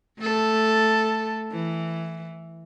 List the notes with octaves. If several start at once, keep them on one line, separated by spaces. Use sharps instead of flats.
A3 A4
E3